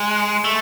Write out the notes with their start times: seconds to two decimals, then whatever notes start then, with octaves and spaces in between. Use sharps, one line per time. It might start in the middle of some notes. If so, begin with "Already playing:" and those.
Already playing: G#3
0.45 A3